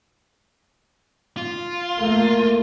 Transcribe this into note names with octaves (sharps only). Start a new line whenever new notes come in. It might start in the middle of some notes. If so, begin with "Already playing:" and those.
F4
A3 A#3